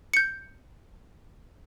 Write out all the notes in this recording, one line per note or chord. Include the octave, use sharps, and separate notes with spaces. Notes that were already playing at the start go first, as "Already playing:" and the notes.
G6 C#7